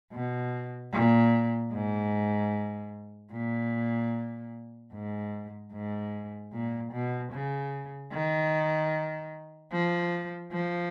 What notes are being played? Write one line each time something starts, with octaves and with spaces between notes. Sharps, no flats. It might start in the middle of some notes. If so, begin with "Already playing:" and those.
B2
A#2
G#2
A#2
G#2
G#2
A#2
B2
C#3
D#3
F3
F3